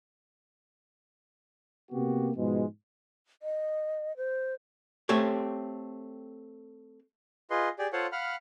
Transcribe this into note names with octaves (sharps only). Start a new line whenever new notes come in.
C3 A#3 B3 F#4 G4
G#2 B2 F3 G#3
D#5
C5
A3 C4 G4 C#5
F4 G#4 B4 D#5 C6
G4 G#4 D5
F4 A4 C5 C#5 F5 F#5
F5 F#5 B5 F6